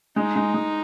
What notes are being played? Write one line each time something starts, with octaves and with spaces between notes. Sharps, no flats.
G#3 D#4
G#3
G#3